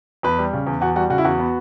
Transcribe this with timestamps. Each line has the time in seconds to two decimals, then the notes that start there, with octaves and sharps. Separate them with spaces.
0.23 E2 B4
0.38 G3
0.53 C#3
0.66 E2
0.81 E2 F#4
0.95 G3 F#4
1.10 C#3 F#4
1.18 E4
1.25 E2 F#4
1.39 B3